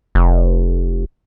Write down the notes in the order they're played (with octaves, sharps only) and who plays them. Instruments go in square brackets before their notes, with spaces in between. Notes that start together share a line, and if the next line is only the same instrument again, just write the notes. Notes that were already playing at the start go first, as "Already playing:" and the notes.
[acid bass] F1